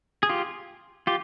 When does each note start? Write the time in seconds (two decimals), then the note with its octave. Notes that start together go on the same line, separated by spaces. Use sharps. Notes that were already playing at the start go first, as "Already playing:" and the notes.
0.23 G#4
0.29 F4 G4
1.07 F4 G4